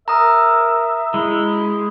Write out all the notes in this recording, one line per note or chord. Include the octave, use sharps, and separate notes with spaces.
A#4 E5 A#5 D#6
G#3 E4